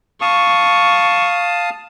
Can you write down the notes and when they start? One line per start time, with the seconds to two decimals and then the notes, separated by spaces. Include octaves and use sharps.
0.21 F5 A5 C#6 D#6